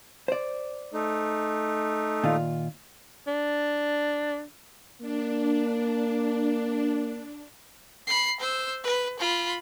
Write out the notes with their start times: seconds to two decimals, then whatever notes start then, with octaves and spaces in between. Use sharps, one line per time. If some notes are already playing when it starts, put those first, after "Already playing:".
0.28 C5 D5
0.93 A3 D#4
2.24 A#2 D#3 F4
3.27 D4
5.01 A#3 D4
8.07 B5 C7
8.40 C5 E6
8.84 B4
9.19 F4 B5